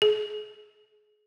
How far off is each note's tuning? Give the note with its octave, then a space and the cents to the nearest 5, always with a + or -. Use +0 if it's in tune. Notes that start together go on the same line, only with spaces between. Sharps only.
G#4 +25